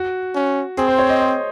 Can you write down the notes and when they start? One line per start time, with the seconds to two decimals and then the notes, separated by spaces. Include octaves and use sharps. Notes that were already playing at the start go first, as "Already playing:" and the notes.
Already playing: F#4
0.35 C#4
0.77 C4 G#4
0.88 C5
0.98 C#5
1.09 D#5
1.20 D#5